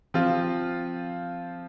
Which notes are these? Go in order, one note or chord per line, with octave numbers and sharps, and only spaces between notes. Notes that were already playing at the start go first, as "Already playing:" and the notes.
F3 C4 F4